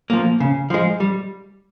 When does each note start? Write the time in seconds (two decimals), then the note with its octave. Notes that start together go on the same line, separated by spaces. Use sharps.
0.10 F3 A#3
0.40 C#3
0.70 F3 G#3
1.00 G3